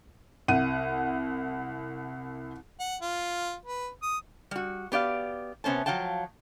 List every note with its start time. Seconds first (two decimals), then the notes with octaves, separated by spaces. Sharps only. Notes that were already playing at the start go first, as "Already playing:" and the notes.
0.48 C2 F#5 D#7
2.80 F#5
3.02 F4
3.66 B4
4.03 D#6
4.51 G3 F#4
4.92 B3 G4 D5 F5
5.64 C3 B3 C#4 C5 A5
5.86 F3 F#3 F5 G5 A5